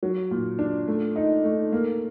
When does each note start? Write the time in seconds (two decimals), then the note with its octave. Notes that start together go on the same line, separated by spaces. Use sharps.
0.03 F#3
0.31 A#2
0.59 D4
0.88 A3
1.16 D#4
1.44 A3
1.72 A#3